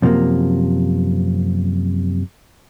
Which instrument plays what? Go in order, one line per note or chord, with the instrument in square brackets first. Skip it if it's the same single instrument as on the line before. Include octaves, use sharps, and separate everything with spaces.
[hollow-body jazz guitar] F#2 C3 F3 G#3 A#3